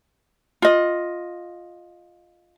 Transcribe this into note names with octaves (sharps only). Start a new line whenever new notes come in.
F4 D#5